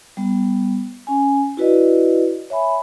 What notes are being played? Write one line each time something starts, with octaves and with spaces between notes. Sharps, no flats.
G3 B3
C#4 G#5
E4 F#4 B4 D5 D#5
C#5 E5 G#5 B5